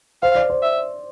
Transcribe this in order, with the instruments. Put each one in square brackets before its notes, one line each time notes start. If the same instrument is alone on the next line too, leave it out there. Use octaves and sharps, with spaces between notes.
[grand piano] C5 [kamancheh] F5
[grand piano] D5
C5
[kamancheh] E5